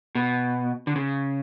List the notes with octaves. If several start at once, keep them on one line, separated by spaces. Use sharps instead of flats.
B2
D3
C#3